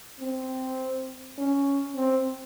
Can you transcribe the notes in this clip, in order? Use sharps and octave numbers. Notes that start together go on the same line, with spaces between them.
C4
C#4
C4